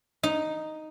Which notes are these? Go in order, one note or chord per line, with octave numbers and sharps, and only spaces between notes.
D#4